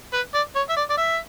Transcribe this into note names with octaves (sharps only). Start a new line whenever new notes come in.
B4
D5
C#5
E5
D5
D5
E5